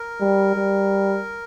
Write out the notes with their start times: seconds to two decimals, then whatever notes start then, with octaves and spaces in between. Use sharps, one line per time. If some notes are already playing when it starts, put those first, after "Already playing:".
Already playing: A#4
0.21 G3
0.55 G3